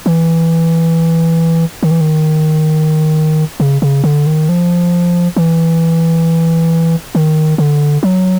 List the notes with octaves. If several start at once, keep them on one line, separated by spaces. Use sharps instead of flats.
E3
D#3
E3
D#3
C#3
C#3
D3
D#3
F3
E3
D#3
D3
F#3